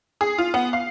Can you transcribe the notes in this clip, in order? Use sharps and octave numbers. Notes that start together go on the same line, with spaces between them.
G#4
F4
B3
F5